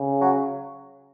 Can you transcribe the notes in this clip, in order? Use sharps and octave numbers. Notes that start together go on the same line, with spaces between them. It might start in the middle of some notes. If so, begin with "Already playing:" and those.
Already playing: C#3
F#3